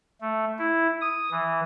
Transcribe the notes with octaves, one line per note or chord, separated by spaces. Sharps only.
A3
E4
D#6
E3